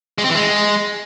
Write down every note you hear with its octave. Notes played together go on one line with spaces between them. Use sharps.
G#3
C4
E3
G#3